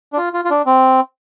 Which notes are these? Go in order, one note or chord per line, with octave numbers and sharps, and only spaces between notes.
D4
F4
F4
F4
D4
C4